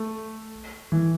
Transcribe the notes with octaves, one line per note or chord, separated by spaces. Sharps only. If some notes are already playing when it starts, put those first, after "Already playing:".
Already playing: A3
E3